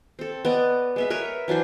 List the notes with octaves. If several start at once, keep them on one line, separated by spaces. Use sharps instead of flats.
C4 A4
B3 D5 D#5
G#3 B3 E5
A#4 B4 C#5 E5
E3 F#3 D4 C5